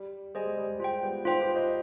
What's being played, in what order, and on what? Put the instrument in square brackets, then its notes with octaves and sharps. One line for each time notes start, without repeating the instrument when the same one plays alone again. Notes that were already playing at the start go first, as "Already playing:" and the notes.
Already playing: [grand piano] G3
[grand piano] G3 [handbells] G#4 C5 D#5 G#5
[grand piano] G#3
G3
[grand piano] G#3 [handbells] F4 C5 G5
[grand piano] G3 B3
[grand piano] D#4 G4 [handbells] F4 C5 G5
[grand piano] G4 B4
C5 D#5